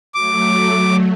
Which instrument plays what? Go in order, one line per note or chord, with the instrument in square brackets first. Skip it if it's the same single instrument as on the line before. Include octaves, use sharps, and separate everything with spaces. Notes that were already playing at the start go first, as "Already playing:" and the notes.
[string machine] F#3 A3 [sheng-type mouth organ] D6